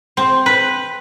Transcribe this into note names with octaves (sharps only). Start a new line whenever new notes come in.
C4
B4